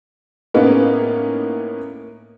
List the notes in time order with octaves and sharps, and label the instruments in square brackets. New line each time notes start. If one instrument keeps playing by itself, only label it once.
[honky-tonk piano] A2 A#3 B3 C#4 D#4